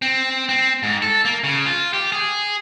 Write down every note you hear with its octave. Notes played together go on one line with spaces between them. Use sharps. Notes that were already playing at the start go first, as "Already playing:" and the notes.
C4
C4
G#2
A4
A#3
C#3
F4
G4
G#4